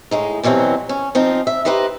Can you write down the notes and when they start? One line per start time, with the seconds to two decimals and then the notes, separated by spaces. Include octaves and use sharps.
0.11 A2 G#3 D#4
0.43 G2 B2 E3 F#3 C4
0.89 C#4
1.15 F3 C4 D#4 F4
1.47 E5
1.65 D#4 G4 B4 C5 D#5